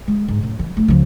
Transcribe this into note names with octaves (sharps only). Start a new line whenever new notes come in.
G#3
G#2
F#2 A2
E3
A3 D#4
C#2 F3